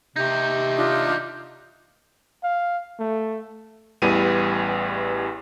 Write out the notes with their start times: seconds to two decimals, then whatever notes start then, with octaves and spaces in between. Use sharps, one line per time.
0.16 C3 D#4 G4 G6
0.76 D4 F4 D#6
2.44 F5
2.99 A3
4.02 A1 E2 E3 G3 B3 D#7